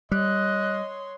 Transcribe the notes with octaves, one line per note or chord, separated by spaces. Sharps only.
G3 C#5 D#5 C6 F#6